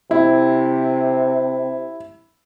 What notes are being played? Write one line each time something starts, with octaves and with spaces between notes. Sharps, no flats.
C3 E4